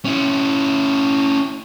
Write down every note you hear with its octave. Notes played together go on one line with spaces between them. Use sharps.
C#4 E4